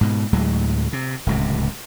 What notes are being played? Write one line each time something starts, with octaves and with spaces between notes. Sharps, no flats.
G#2 B2
D2 A2 F#3 G#3
C3
D1 C#2 C3